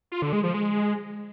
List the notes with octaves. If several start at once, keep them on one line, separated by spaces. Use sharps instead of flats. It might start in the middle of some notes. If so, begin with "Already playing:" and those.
F4
D3
G#3
F3
G#3